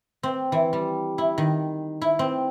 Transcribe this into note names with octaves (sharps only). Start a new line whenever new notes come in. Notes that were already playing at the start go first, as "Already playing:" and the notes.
C4
E3
G3
E4
D#3
E4
C4